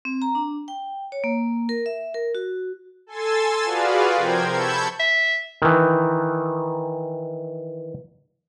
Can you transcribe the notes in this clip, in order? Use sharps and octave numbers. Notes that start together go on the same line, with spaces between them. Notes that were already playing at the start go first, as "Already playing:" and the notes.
C4
A#5
D4
G5
C#5
A#3
A#4
E5
A#4
F#4
A4 G#5 C6 E6 A6
F4 F#4 G#4 B4 D5 F5
C3 F3 A#4 C5 G5 G#6
A5 B5 C#6 E6 G6 G#6
E5
D#3 E3